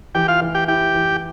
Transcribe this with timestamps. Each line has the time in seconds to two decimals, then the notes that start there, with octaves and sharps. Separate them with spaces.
0.15 E3 G4 G5
0.28 F4 F5
0.41 E3
0.54 G4 G5
0.68 E4 G4 G5
0.95 E3